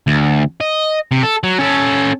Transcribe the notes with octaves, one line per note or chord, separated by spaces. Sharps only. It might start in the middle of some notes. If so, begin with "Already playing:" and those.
D2
D#5
C3
A4
F#3
C#4 A4